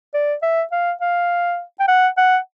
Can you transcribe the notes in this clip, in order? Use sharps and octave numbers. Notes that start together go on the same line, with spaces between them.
D5
E5
F5
F5
G5
F#5
F#5